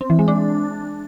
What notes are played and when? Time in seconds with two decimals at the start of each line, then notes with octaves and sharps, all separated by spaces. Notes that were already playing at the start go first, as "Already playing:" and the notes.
0.01 C4
0.10 E3
0.19 G#3
0.28 D4